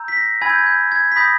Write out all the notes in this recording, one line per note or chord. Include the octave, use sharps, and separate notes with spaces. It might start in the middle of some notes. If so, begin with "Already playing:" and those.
Already playing: A#5 E6 G6
B6
A#6
G#5 B5 E6 G#6
G6
G#6
G6
G#6
B6
B5 D#6 G6 A#6